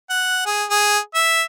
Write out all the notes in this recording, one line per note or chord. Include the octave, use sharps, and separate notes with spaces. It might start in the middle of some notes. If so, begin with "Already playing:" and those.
F#5
G#4
G#4
E5